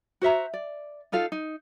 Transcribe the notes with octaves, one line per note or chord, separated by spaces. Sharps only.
F#4 C5 E5 A#5
D5
D#4 F4 A4 F5
D#4